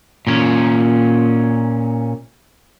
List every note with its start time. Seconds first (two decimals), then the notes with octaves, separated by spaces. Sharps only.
0.27 A#2 C#4